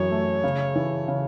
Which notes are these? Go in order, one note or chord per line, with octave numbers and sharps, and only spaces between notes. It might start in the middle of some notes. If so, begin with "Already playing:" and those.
Already playing: F#2 E3 C#5
A3
C#3
E3
C#3